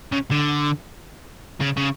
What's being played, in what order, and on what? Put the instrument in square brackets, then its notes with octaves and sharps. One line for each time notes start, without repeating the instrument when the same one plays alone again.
[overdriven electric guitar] C#3
D3
C#3
C#3